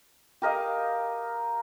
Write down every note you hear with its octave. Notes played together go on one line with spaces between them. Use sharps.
G4 A#4 D#5 F5